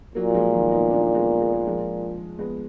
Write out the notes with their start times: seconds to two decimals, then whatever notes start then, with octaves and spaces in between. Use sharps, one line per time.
0.15 A#2 F#3 A#3
0.30 F#3
0.34 F3 G#3
0.53 D#3 F#3
0.71 B3 D#4
0.90 A#3 D4
1.15 G#3 B3
1.41 G#3
1.53 A#3
1.67 F3 G#3
2.39 G#3 B3